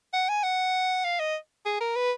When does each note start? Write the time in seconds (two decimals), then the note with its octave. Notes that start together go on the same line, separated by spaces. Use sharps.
0.13 F#5
0.29 G#5
0.43 F#5
1.05 F5
1.19 D#5
1.65 G#4
1.81 A#4
1.96 B4